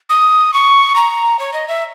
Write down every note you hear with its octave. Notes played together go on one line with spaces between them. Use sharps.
D#6
C#6
A#5
C#5
D#5
E5